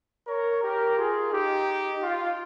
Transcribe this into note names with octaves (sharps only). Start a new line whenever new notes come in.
A#4 C#5
G4 A#4
F4 G#4
D#4 G4
F4